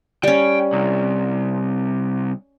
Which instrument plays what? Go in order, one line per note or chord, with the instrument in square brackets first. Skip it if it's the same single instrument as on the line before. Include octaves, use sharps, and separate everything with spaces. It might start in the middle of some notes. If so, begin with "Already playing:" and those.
[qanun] G3 C#4 [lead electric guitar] G5
[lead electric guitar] C2